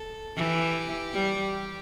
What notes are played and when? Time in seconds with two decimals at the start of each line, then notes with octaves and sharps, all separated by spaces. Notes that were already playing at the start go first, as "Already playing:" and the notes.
Already playing: A4
0.36 E3 G4
1.14 G3